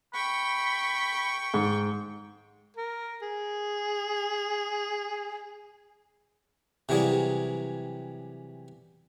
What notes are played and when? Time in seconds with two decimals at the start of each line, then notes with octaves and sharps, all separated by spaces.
0.14 G5 B5 C#6
1.54 G#2
2.77 A#4
3.22 G#4
6.89 C3 E3 F#3 G3 G#4